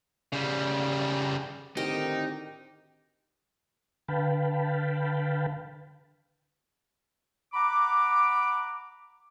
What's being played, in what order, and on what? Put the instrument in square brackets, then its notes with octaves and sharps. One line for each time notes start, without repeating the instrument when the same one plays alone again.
[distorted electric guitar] C#3 G3
[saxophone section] A2 D3 D#3 [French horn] C4 [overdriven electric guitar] D#4 [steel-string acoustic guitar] G4
[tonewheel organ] D3 B4 F5 G5 A5 B5
[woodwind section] F#5 A#5 B5 D6